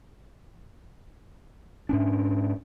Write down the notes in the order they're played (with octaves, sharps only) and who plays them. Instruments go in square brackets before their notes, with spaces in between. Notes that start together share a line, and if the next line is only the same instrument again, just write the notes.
[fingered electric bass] G#2 C#4 D4